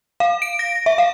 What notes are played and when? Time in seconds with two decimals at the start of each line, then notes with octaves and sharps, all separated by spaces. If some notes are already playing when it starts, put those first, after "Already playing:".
0.20 F5
0.42 D7
0.59 A#6
0.86 E5
0.98 F5